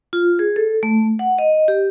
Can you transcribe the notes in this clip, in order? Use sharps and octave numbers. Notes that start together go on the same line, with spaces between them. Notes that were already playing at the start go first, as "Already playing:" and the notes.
F4
G#4
A4
A3
F#5
D#5
G4